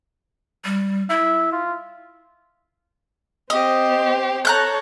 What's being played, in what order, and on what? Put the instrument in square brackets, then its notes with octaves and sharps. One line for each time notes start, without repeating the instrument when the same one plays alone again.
[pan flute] G3
[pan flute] E4 [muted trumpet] E5
[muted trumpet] F4
[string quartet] C4 G4 C5 [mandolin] D#5
[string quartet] A4 C#5 [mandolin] A#5 F#6 G6